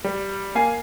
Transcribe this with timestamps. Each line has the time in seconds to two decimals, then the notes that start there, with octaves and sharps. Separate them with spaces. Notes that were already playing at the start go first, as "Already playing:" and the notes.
0.04 G3
0.55 A#3 F5 G#5 C7